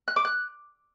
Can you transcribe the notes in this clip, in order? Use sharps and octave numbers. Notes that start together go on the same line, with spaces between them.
F#6
D6
F#6